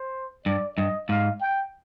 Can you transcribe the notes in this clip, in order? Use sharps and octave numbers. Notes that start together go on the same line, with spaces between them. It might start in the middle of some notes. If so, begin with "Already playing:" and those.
Already playing: C5
G2 D5
G2 D#5
G#2 F5
G5